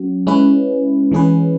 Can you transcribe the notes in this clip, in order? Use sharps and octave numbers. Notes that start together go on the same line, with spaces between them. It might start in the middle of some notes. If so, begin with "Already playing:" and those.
Already playing: F#3 C#4 F#4
G#3 C#4 E4 B4
E3 G#3 C#4 G#4 B4